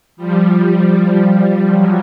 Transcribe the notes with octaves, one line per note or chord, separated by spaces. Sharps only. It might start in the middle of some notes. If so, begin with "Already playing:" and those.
F3 G3
F3 G3
F#3